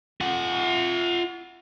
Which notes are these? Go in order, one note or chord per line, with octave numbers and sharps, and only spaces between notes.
F4 F#5